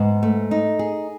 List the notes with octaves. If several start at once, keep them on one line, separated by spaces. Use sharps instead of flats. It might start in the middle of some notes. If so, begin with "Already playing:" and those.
Already playing: G#2 B3
A3
D#4
G#4